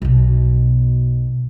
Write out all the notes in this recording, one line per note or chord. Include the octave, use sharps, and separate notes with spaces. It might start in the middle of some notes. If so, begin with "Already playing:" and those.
B1 B2